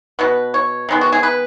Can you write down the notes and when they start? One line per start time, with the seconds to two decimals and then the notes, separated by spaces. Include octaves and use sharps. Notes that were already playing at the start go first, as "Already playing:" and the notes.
0.19 B2 B3 B4
0.54 C#5
0.89 D#3 G#3 B3
1.01 F#4
1.12 G#4
1.23 B4